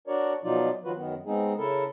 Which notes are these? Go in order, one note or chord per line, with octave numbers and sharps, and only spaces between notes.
D4 F#4 A#4 C#5 D5
B2 F3 F#3 D#4 F4 D5
D#3 F3 F#3 F4 F#4 B4
F#2 D#3 B3
G#3 B3 C4 D#4 G#4
C#3 E4 A4 A#4